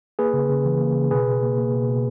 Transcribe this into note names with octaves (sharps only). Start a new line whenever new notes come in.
A#3 G#4 B4
C#3
C#3
E3
A#3
C#3
B2 G#4 B4
B2
A#3
A#3
B2
B2